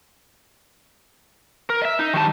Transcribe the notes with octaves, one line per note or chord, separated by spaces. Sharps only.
A#4
D#5 E5
D#4
D#3 G3 A5